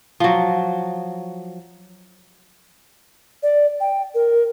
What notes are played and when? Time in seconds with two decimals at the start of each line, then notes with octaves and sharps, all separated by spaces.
0.20 F3 F#3
3.43 D5
3.80 G5
4.15 A#4